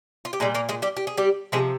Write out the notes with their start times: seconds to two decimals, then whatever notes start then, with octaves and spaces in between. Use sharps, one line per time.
0.25 F4
0.33 G4
0.40 A#2 G3 G#3 G#4
0.54 A#3 A#4
0.69 G#3 G#4
0.82 G3 G4
0.97 G4
1.07 G#4
1.17 G3 G4
1.52 C3 F3 G#3 G#4